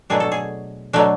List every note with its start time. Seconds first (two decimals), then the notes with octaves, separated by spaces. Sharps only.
0.10 B2 F#3 A3 D4 G#4
0.20 A4
0.32 G#4
0.93 B2 F#3 A3 D4